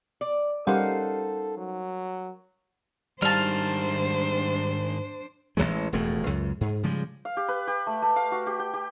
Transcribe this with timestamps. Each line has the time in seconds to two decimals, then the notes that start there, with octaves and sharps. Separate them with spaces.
0.21 D5
0.67 G3 C#4 D#4 A4 A#4 C5 F5 F#5
1.57 F#3
3.22 G#2 D#3 G3 D4 C5 F5 A5
5.57 A1 C3 E3 G#3
5.93 E1 F2 A2 A3
6.26 C#2 F#2
6.61 G#2
6.83 C#3 F3 G3 G#3
7.25 F5
7.37 G4
7.48 B4
7.67 G4
7.87 A3
8.02 A3
8.16 F5
8.32 F#4
8.47 G4
8.59 G5
8.74 G4